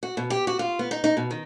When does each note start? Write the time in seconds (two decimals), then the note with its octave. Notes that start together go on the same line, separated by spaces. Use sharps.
0.03 F#4
0.17 B2
0.30 G4
0.47 F#4
0.59 F4
0.79 B3
0.91 D#4
1.04 D#4
1.17 B2
1.31 D#3